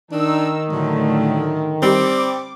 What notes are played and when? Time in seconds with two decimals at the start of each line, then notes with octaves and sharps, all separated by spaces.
0.12 D#3 D4 D#4 E6
0.72 A2 D3 F#3 A3
1.82 G3 C4 D6